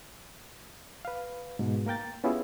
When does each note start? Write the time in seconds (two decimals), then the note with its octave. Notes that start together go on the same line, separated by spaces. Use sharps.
1.05 B4 F5
1.59 G#2 B2
1.86 A#3 A#4 G5 A6
2.24 B3 C#4 E4 F4 G4 G#4